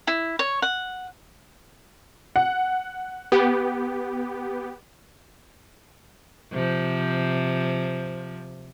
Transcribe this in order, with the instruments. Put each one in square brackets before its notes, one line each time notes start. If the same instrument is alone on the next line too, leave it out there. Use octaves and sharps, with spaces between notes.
[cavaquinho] E4
C#5
F#5
[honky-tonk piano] F#5
[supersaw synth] B3 G4
[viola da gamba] C3 F3